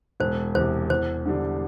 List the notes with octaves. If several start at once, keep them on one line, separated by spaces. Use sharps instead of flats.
E1 C5
E2 C3 C5
E2 C5
D3 G3 D4